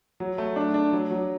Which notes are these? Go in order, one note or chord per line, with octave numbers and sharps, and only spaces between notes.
F#3
A3
D4
D4
F#3
F#3